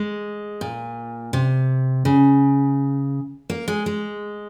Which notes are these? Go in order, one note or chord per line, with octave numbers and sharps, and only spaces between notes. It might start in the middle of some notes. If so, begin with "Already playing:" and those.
Already playing: G#3
A#2
C3
C#3
A#3
G#3
G#3